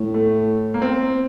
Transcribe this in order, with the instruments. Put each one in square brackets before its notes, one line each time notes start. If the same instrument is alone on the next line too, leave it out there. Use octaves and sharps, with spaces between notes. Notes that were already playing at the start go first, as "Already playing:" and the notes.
Already playing: [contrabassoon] A2
[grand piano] A3
A#3
C4